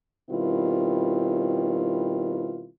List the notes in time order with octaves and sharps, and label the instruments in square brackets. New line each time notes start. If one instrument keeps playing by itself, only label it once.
[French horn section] B2 D#3 G3 C4 E4 F4